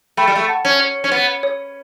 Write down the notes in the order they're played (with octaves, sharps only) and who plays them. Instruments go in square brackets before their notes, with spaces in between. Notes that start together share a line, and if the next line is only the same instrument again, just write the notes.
[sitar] A3 [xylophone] G5 B5
[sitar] G3
A3
[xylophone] F#5 A5
[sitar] C#4
[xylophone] C#5
[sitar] C#4
B3
[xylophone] C#5